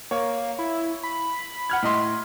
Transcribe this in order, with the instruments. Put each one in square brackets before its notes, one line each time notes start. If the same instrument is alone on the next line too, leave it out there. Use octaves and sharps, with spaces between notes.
[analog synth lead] A#3 [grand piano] C#5
[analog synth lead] E4
B5
[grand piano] F#5 F6 G#6
A2 D#5 C6